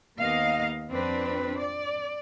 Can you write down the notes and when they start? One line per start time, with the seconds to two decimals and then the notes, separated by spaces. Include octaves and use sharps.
0.19 D#2 A#3 B3 D#5 F5
0.90 F2 C4 D4 B4
1.57 D5